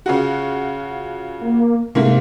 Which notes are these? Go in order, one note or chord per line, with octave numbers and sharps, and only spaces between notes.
C#3 F4 F#4
A#3
G#2 C3 A3 A#3